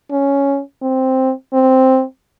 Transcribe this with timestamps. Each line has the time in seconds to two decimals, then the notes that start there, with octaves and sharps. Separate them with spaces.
0.10 C#4
0.82 C4
1.53 C4